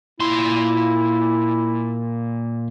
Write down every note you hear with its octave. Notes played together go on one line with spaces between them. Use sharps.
A#2 E4 C6